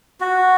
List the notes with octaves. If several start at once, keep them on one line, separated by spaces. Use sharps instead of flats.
F#4